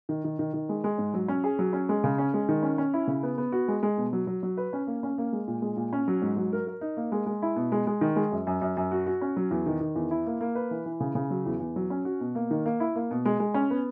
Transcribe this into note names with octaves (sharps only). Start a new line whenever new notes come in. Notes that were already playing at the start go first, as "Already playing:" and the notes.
D#3
D#3
D#3
D#3
G#3
G#3
G#2
F#3
C#4
G#4
F#3
C#4
G#3
C#3
C#4
G#3
D#3
C#4
C#4
E4
C#3
B3
B3
F#4
G#3
G#3
B2
F#3
F#3
F#3
B4
C#4
A#3
C#4
A#3
G#3
A#2
G#3
A#2
C#4
F#3
G#2
F#3
A#4
A#4
D#4
A#3
G#3
G#3
E4
B2
G#3
G#3
D#3
G#3
F#2
F#2
F#2
F#2
F#4
F#4
C#4
F#3
E2
D#3
D#3
E2
E4
A#3
A#3
B4
E3
E3
C#3
C#3
F#3
E2
E2
F#3
C#4
F#4
B2
A#3
D#3
A#3
E4
A#3
B2
G#3
G#3
C#4
B3